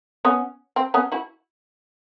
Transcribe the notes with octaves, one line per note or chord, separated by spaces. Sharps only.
B3 C#4
C4
B3 C#4
E4 F#4